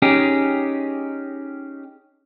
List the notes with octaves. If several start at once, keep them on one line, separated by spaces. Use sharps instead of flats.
C#4 D#4 G4 G#4